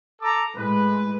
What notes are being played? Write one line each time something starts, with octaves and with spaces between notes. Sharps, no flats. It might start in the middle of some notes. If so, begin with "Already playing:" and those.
A4 A#5 D6
A2 G#3 B4